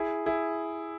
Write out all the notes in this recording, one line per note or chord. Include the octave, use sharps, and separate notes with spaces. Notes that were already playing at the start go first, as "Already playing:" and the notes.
Already playing: E4 G#4
E4 G#4